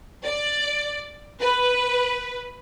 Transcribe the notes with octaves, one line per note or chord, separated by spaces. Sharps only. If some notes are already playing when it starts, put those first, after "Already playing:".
D5
B4